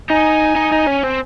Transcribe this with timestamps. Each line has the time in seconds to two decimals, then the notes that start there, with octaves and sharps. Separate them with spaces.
0.10 D#4 G#5
0.56 D#4
0.72 D#4
0.87 C#4
1.04 C4